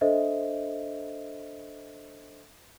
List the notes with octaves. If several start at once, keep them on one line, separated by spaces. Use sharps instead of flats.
D4 A4 C5 D#5 E5